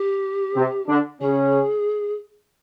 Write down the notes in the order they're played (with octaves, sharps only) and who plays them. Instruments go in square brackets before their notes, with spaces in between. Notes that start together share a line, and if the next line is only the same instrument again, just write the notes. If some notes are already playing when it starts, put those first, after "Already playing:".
Already playing: [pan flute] G4
[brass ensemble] C3 C4
D3 D4
[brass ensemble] C#3 C#4 [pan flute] G#4